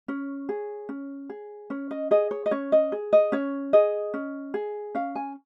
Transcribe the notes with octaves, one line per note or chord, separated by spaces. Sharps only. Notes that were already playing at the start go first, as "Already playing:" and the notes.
C#4 C#5
G#4
C#4
G#4
C#4 C#5
D#5
G#4 D#5
C#5
D#5
C#4 C#5
D#5
G#4
D#5
C#4 C#5
G#4 D#5
C#4
G#4
C#4 F5
G#5